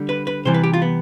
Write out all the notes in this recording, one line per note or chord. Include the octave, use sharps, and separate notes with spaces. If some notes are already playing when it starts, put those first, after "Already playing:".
Already playing: D3 G3
B4
B4
C3 E3 G3 C5
B4
G4
F4
B3